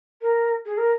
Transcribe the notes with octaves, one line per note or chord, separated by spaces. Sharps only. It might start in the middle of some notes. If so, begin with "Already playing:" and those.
A#4
G#4
A#4